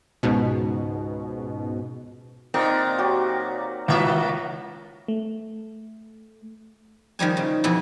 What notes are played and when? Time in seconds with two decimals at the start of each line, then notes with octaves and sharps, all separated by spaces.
0.23 C#2 G#2 B2
2.54 A#2 D#3 A#3 C4 D#4
2.98 F#3 F#4 G4
3.88 C#2 D#3 A#3 F#4 E5
5.08 A3
7.19 D#3 F3 G3 G#5
7.37 C#3
7.64 F2 B2 E3 B3 E4